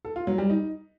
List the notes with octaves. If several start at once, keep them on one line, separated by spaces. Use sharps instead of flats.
A4
F4
F#3
G3
D#4